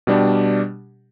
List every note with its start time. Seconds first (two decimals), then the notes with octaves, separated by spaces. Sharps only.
0.07 B2 G3 D4 G4